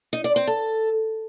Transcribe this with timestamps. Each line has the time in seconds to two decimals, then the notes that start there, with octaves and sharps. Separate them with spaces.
0.13 D#4
0.24 D5
0.36 C4
0.47 A4